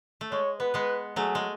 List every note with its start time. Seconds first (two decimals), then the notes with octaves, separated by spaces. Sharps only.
0.21 A3
0.32 G#3 C#5
0.60 B3 B4
0.74 G#3 B3
1.16 F#3 A3 G#4
1.35 G#3